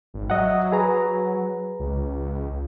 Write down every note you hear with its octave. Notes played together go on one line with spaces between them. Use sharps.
G#1
F#3 D#5 E5 F#5
G#4 B4 A#5
C#2